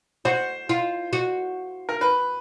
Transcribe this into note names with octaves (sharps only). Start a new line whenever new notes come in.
F#4 C5
F4
F#4
A#4
B4